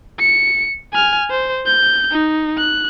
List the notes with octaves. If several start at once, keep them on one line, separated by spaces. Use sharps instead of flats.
C#7
G#5 F6
C5
G6
D#4
F#6